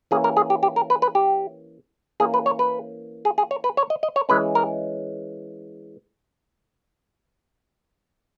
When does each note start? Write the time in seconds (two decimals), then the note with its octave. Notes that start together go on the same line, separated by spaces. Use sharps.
0.11 E3 A#3 C#4 G#4
0.24 A#4
0.37 G#4
0.50 G4
0.63 G4
0.76 A#4
0.90 B4
1.02 B4
1.15 G4
2.20 E3 A#3 C#4 G#4
2.34 B4
2.46 C#5
2.59 B4
3.25 G#4
3.38 G#4
3.51 C#5
3.64 B4
3.77 C#5
3.90 D#5
4.03 D#5
4.16 C#5
4.29 E3 G#3 C#4 B4
4.55 A#4